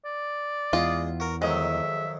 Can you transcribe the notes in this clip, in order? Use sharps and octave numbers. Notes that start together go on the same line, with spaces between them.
D5
E2 G#3 F4 D#5
F#4 A#4
F2 D#3 F#3 G#3 E5